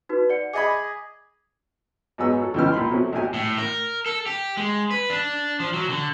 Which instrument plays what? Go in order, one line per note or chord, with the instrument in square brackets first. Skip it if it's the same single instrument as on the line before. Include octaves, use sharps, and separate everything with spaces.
[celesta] D#4 F#4 B4
D5 F#5 C#7
[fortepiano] G#4 D#5 B5 [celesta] D6 G#6
[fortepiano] G#2 F#3 B3 G#4 E6
F#3 A4
C#2 C#3 E3 G3 G4 F6
A#2 F4 G4 B5 C6
C3 F3 F#3 A3
A#1 F#3 G4 G#5
[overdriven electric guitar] A2
A#4
A4
G4
G#3
B4
D4
F3
F#3
D3